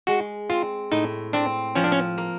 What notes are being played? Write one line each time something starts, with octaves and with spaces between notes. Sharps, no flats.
G#3 F#4
C4 F4
A2 D#4
C4 D4
F3 C#4
D4
C#4
A#3